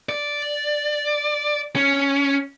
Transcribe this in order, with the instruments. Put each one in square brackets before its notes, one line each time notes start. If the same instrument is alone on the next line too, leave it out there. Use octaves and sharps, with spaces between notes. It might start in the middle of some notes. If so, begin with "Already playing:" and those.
[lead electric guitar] D5
C#4